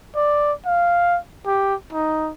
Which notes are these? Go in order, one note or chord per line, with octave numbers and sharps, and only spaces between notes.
D5
F5
G4
D#4